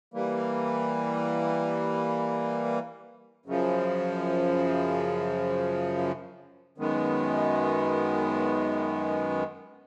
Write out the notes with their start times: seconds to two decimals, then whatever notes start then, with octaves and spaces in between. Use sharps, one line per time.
0.14 E3 G3 A#3
3.46 F#2 C#3 F3
6.78 F#2 D#3 G#3 B3